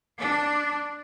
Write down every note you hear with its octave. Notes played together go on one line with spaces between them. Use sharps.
D4